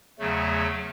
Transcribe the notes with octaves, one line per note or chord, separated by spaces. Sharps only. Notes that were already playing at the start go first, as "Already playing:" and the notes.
E2 C#3 F#3 A3